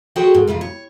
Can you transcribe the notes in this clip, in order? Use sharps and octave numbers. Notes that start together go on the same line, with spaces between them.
F#4 G#4 A4 B4 C5 G5
G#2
F2 C3 E3 F4
C#5